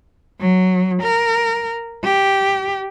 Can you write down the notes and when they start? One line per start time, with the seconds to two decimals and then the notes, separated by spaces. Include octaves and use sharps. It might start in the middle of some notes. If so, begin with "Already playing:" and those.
0.40 F#3
1.02 A#4
2.04 G4